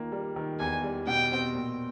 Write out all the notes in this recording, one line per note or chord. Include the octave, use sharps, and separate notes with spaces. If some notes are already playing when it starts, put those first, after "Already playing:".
Already playing: D#3 A#3 F4
G3
D#3
E2 G#5
G3
B2 G5
C4
A#2